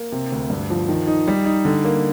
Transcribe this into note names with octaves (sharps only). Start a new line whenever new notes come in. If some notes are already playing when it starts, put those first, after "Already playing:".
Already playing: A#3
C3
D2
G2
F3
D#3
D#4
G3
D#4
D3
A#3